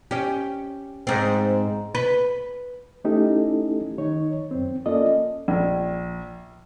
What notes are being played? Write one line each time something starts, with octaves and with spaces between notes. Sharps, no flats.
C#4 G4
G#2 C4
B4
A3 C#4 D#4 E4 G4 A4
D#3 D#4 C#5
F#2 C4
A#3 C#4 F4 A4 D5 D#5
A#1